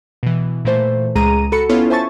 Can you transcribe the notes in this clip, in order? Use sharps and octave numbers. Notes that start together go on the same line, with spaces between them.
B2 E3
A#2 E3 A3 C5
C#2 G#3 G#4 A#5 D#7
F#4 A4 B5 C#7
B3 C#4 E4 F4 A4 C#5
C5 E5 G#5 A5 C#6 A6